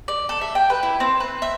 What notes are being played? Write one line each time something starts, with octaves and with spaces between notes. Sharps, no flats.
D5
A4
E5
G5
B4
E4
C4
B4
E5